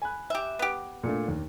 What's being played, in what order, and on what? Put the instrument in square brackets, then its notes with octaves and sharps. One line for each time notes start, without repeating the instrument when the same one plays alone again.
[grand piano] G#5 B5 F#6
[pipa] G4 E5
B3 G4
[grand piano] A#2 A3 D4
D#2